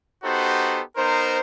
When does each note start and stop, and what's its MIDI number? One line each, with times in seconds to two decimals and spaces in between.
0.24 0.83 59
0.24 0.83 63
0.24 0.83 66
0.24 0.83 67
0.24 0.83 69
0.24 0.83 72
0.97 1.41 59
0.97 1.41 63
0.97 1.41 70
0.97 1.41 72